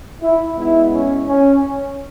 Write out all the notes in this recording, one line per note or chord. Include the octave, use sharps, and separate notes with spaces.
E4
B2 G#3 B3 E4
C#4
C#4